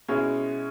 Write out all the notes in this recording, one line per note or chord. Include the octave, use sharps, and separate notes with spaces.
B2 G#3 C#4 E4